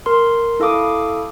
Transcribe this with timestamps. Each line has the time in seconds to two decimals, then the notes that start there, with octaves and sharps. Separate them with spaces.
0.06 A#4 C6
0.60 E4 A4 F5 D6 D#6